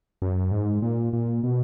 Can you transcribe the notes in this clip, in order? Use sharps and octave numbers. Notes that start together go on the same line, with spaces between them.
F#2
G#2
A#2
A#2
B2